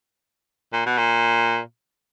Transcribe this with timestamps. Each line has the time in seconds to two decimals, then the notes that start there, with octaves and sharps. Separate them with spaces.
0.73 A#2
0.86 B2
0.98 A#2